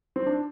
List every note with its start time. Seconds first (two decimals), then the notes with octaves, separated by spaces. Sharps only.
0.16 C4
0.26 D4